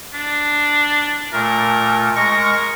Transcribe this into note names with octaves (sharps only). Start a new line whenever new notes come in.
D4
A#2 A3 A#4
G#3 A#4 C#6 A#6